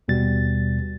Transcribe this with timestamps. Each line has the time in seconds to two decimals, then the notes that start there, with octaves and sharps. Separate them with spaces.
0.08 D#2 B2 G3 A6